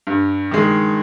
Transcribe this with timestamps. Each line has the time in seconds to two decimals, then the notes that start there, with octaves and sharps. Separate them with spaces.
0.07 G2
0.51 D#3 G#3